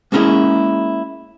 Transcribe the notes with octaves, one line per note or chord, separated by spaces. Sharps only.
G#3 A#3 C#4 E4 G#4